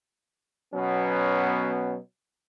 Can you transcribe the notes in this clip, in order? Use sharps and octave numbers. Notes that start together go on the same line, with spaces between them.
B2 F#3 B3 C#4